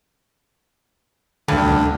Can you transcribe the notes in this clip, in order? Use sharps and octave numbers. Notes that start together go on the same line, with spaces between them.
D2 G2 D3